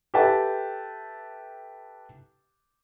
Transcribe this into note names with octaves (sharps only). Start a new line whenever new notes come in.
G4 A4 B4 E5 G5 A5